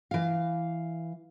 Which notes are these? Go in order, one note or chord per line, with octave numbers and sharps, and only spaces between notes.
E3 F5